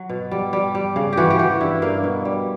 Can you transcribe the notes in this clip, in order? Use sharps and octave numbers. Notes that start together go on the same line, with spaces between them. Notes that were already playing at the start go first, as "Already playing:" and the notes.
Already playing: F#3
B2
G3
G3
G3
C#3
E3 F#4 G4
G4
E3 F#4
G2 E4
G2 A#3
B2
G3